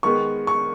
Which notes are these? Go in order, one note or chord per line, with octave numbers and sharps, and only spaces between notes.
D#3 G#3 B3 C#6
C#6